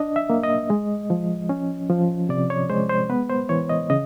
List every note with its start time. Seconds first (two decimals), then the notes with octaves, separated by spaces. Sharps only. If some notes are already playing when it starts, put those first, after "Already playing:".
Already playing: D4 D#5
0.16 E5
0.30 A#3
0.43 D#5
0.70 G#3
1.10 F3
1.49 C#4
1.90 F3
2.29 C3 D5
2.50 C#5
2.69 G#3 C5
2.89 C5
3.10 B3 B4
3.30 C5
3.49 E3 C#5
3.69 D#5
3.90 C#3 D#5